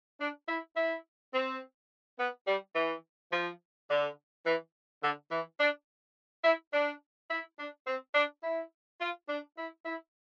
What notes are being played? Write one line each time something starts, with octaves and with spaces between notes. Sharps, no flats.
D4
E4
E4
C4
B3
G3
E3
F3
D3
E3
D3
E3
D4
E4
D4
E4
D4
C4
D4
E4
F4
D4
E4
E4